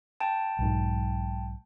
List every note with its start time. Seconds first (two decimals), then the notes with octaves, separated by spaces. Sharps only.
0.20 G5 A5
0.59 B1 G#2